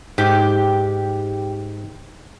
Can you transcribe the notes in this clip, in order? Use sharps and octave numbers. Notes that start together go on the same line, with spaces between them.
G#2 G4